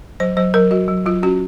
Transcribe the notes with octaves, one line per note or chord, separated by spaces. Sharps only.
F#3 C5
F#3 C5
F#3 A#4
F#3 F#4
F#3
F#3 F4
C#4 F#4